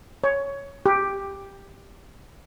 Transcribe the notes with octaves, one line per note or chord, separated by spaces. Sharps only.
C#5
G4